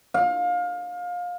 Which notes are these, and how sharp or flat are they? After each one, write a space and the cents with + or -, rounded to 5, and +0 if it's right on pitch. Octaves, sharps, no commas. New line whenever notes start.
F5 +25